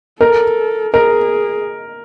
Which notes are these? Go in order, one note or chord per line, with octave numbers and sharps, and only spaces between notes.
A4 A#4
G#4 A#4